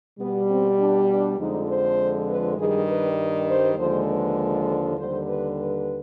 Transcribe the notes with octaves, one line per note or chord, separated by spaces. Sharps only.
B2 G3 B3
C4
D4
D4
F2 D3 F3 G#3 D#4
C5
B4
G2 D#3 G3 G#4
B4
C5
D#2 D3 F3 G#3 C5
B4
D#2 D3 G3 C5
B4
B4